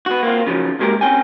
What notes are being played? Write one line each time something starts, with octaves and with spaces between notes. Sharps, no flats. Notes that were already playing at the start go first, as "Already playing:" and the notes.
B3 F#4
A#3 C4 F4
C#3 F3 F#3
B1 F#2 G#3 A#3 G4 A#4
C4 C#4 G5 G#5